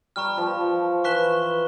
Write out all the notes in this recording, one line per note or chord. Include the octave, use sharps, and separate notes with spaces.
G3 A#5 C#6 F6
F3
F3
E3 C#6 F#6 B6 E7 G7